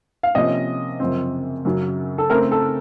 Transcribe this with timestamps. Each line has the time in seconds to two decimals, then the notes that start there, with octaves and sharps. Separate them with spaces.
0.23 F5
0.35 C3 F3 A#3 C#4 D#5
1.00 F#2 C#3 F3 C4
1.65 F#2 C#3 F#3
2.18 A4
2.30 C#3 A3 C4 A#4
2.52 A4